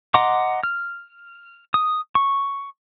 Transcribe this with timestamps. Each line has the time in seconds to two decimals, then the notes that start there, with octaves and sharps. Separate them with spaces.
0.14 D#5 F#5 A#5 C6 D6
0.63 F6
1.74 D#6
2.15 C#6